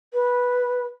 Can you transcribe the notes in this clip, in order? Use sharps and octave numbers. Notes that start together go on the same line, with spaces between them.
B4